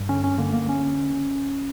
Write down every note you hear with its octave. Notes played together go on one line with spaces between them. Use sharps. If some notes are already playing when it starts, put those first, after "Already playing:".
Already playing: G2
D3 C#4
C#4
D3 A#3
A#3
C#4